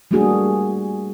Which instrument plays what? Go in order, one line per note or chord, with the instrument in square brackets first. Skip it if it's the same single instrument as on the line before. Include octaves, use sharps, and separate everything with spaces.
[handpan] G3 A3 A#3 D4 F#4 G#4